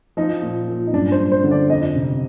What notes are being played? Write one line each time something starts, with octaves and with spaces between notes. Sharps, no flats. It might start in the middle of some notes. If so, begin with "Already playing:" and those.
F3 D#4
A#2
A#2
D#4
G2 D4
C5
G2
C5
D3
D5
F2 D#5
C3